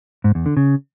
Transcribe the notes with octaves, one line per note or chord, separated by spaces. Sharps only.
G#2
E2
D3
C#3